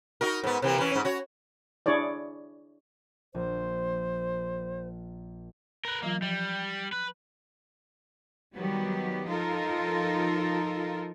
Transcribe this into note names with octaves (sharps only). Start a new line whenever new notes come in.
D#4 F#4 A#4
G#2 B3
C3 E3 A#3
E3 C#4
G#2 C#4
F#4 C#5
D4 E4 G#4 C#5 D5
A#1 C5
A#4 B4
E3 F#3 A#3 F4
F3 G3
B4
D#3 F#3 G3 B3 G4
F3 D#4 F4 A4 A#4